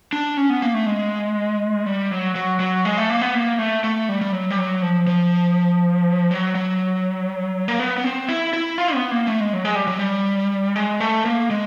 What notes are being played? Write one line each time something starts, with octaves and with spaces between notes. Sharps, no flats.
D4
C#4
B3
A#3
A3
G#3
G3
F#3
F#3
F#3
G#3
A3
A#3
B3
A#3
A3
A3
G3
G3
F#3
G3
F#3
F3
F3
F#3
F#3
A#3
B3
B3
C4
E4
E4
F4
B3
A#3
A3
G#3
F#3
G#3
G3
F#3
G3
G#3
A3
A#3
G#3